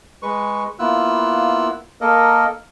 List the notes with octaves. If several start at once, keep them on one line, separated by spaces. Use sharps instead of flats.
G#3 B4 C#6
A#3 B3 E4 F4 E6 F#6
A#3 A4 A#4 D#5